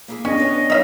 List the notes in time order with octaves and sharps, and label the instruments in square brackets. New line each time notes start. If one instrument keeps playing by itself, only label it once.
[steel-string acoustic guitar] A#3 E4 G#4
[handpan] B3 D4 [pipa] C#4 [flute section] D#5
[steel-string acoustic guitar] B4 C#5 D5
[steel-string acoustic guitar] F#3 [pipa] D#4 E5 F5